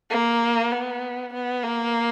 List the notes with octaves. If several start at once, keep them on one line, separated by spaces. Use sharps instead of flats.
A#3
B3
B3
A#3